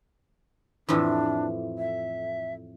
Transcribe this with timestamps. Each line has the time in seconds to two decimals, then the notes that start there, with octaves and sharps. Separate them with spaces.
0.89 F2 A2 E3 D4
1.79 E5